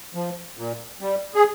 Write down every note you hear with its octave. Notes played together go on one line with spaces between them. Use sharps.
F3
A#2
G3
G#4